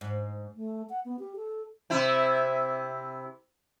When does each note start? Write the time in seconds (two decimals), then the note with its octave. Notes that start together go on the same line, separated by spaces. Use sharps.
0.01 G#2
0.55 A3
0.90 F#5
1.05 B3
1.19 G4
1.36 A4
1.90 C3 E4